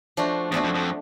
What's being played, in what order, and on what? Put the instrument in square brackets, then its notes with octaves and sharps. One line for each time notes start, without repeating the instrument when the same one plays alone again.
[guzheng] F3 A3 D4 F#4
[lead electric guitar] E2 [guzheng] F3 A3 D4 F#4
[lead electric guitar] F2
F2